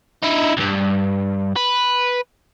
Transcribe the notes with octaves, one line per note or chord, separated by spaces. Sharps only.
D#4 E4
C#2 G2
B4